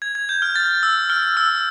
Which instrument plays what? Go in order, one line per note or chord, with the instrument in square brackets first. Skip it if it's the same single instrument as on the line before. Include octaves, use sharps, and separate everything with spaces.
[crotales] G#6
G#6
G6
F6
A6
E6
F6
E6